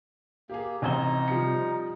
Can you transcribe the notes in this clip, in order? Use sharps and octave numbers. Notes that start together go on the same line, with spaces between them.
A#3 G4 G#4
A1 C3 C4 D#4 C5 G#6
F3 G3 C#7